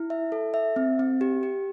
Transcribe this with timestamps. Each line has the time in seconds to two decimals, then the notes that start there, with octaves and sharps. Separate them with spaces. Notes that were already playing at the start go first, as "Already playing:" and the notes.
Already playing: E4
0.10 E5
0.32 A4
0.54 E5
0.76 C4
0.99 C4
1.21 G4
1.43 G4